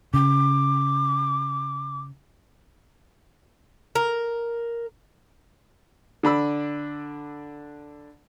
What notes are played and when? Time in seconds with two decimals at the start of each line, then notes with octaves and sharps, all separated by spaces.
0.14 C#3 D6
3.95 A#4
6.23 D3 D4 B5 E6